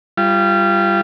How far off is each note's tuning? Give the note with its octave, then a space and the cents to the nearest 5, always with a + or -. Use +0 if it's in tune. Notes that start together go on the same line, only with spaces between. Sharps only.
G3 +0 F4 -25